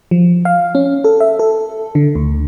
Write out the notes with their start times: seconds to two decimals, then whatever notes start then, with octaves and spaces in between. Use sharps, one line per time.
0.11 F3
0.45 F5
0.75 C#4
1.04 A4
1.20 E5
1.39 A4
1.95 D3
2.15 D2